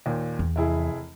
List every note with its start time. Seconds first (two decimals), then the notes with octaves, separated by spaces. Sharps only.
0.06 D#2 A#2
0.39 E2
0.56 F1 E4 G#4